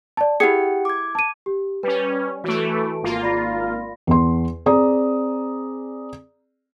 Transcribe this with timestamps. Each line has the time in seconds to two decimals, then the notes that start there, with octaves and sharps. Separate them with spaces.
0.17 D5 A5
0.40 E4 G4 G#4 F#5 G5 C#7
0.85 D6 G#6
1.15 A5 D#7
1.46 G4
1.83 G3 C#4 B4
2.44 E3 A3 F#4 D7
3.03 G#1 A#3 F4
3.23 D5 B5 A#6
4.07 E2 C6
4.66 C4 G#4 D5 A#5 D#6